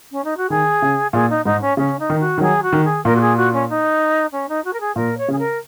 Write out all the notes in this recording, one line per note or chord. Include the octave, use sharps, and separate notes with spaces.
C#4
D#4
F#4
D#3 G#4
C#3
A#2 G#4
D#4
G#2 D#4
C#4
C#3 C#4
D#4
D#3
F#4
D#3
F#3 G#4
F#4
D#3
G#4
A#2 A#4
F#4
G#4
F#4
C#4
D#4
C#4
D#4
F#4
A#4
G#4
A#2 A#4
C#5
C#3 G#4
A#4